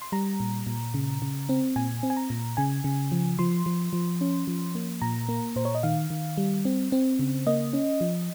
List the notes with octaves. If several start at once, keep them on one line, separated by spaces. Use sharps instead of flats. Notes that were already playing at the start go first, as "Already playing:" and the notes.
C6
G3 A#5
A#2
A#2
C#3
C#3
C4
A#2 G#5
C4
G#5
A#5
A#2
C#3 G#5
C#3
F3
F3 C6
F3
F3
C#4
F3
A#3
A#2 A#5
A#3
A#2 C5
C#5
D#5
D#3 F5
D#3
G3
C4
C4
C#3
A#3 D#5
C#4
F3